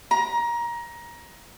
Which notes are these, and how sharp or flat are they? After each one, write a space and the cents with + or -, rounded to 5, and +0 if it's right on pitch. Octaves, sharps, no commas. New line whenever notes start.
A#5 +20